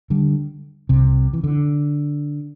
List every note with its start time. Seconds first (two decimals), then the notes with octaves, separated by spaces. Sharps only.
0.10 D3 G3
0.89 C2 C3
1.33 E3
1.44 D3